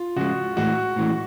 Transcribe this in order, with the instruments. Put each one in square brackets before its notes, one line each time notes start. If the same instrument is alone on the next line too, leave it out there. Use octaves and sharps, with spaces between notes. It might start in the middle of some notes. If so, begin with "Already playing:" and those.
Already playing: [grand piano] F4
[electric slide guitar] C#3 F3 G#3 [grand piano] F#4
[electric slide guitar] A2 E3 G#3 [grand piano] F#4
[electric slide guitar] A2 E3 G#3